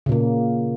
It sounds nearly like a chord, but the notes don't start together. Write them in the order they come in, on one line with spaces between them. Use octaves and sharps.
C#3 A#2 A#3